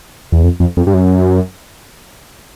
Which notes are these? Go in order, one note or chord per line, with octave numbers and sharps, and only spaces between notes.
E2
F2
F2
F2
G2
F#2